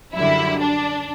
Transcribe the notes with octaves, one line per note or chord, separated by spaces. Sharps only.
F#2 D3 G3 E4
D4